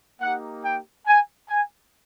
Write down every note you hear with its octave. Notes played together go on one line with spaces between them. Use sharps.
A#3 D#4 G4 F#5
G5
G#5
G#5